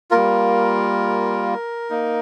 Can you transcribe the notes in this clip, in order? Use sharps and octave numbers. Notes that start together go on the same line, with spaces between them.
G3 A#3 F4 A#4
A#3 D#4